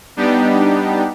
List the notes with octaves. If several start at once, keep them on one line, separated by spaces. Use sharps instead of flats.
G3 B3 D4 D#4 G4